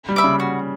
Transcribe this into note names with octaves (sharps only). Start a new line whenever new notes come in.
G3
E5 B5 D6
C#3
F#4